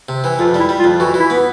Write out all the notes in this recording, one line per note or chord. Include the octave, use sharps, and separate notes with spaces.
C3
E3
F2 F4
G3 E4
G3
F4
F2
E3 F#4
E3
E4
B3